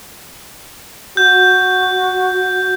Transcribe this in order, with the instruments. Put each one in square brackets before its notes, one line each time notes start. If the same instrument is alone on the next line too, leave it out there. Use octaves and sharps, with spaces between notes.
[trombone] F#4 [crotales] G6